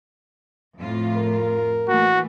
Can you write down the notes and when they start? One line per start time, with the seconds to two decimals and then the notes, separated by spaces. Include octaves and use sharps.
0.79 F2 A2 F4
1.17 A#4
1.88 E3 A3 A#3 F#4